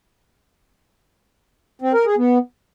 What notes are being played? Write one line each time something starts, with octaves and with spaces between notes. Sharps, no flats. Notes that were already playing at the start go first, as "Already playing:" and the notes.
C4
A#4
G#4
B3